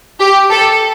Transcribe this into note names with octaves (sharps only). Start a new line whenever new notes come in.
G4
A4